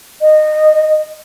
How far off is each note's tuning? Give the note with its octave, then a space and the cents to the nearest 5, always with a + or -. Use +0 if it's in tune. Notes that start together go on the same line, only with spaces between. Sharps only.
D#5 -20